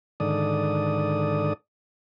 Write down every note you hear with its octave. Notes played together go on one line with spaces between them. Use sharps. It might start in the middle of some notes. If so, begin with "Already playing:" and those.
G#2 D3 D#3 A4 D5 D#6